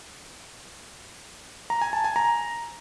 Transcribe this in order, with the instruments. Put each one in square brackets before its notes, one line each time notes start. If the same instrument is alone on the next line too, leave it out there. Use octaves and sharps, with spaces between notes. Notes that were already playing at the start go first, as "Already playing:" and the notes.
[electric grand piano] A#5
G#5
A5
G#5
A#5